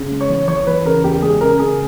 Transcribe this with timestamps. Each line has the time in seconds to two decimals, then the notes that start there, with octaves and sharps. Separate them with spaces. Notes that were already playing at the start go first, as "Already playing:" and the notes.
Already playing: C#3
0.11 G#3
0.21 C#5
0.30 E3
0.48 E3 C#5
0.67 E3 B4
0.85 C#3 A#4
1.04 E2 G4
1.22 G#3 G#4
1.41 C#3 A#4
1.59 C#3 G#4